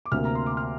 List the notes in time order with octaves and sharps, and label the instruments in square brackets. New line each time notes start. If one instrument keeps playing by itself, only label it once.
[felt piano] D6
D2 C3 A#3 F6
A#5
C6
D6
F6